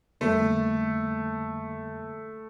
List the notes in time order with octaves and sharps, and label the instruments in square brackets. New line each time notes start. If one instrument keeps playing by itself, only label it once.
[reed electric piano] F2 D3 G3 A#3 [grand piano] A3